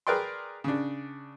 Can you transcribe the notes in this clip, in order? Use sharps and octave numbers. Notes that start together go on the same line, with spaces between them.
G#4 A#4 B4 D5 G5 C6
C#3 D4